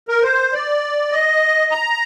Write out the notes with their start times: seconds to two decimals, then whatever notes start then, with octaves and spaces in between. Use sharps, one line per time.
0.08 A#4
0.23 C5
0.53 D5
1.12 D#5
1.71 A#5